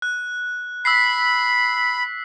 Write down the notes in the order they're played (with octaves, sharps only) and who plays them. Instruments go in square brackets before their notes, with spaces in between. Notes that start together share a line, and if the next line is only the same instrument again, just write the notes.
[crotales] F#6
[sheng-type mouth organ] B5 [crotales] E6 B6 C7